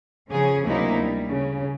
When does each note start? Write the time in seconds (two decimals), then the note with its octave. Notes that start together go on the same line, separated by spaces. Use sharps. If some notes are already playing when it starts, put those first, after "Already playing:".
0.30 C#3 F3 C#4 G#4 C#5
0.65 D2 C3 F#3 A#3 D#4 E4
1.01 G3
1.30 C#3